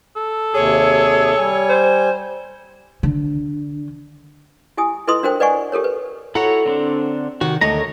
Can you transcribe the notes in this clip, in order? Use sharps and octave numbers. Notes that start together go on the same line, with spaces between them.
A4
D#2 C3 G#4 C#5
G3 G#5
C5
D3
E4 G4 G#5 D#6
E4 A4 B4 D#5 C6 D#6
D4 F#4 A#4 C5 G5
B4 D5 D#5 F#5 G#5 C#6
G4 A4 A#4 C#5
B4
E4 F#4 A4 C#5 F#5 A#5
D3 C4 D4
C3 D#3 F#4 F#5
D2 A3 A#4 C#5 D#5 A#5